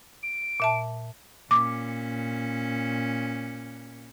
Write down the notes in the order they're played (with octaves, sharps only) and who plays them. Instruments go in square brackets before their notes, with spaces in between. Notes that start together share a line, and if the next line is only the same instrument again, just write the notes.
[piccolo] D7
[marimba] A#2 E5 A5
[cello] A#2 C#4 [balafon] D6